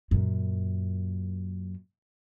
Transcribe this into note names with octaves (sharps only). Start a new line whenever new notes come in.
F#2 A#2